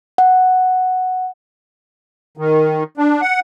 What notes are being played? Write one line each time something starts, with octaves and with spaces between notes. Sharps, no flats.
F#5
D#3
D4
F#5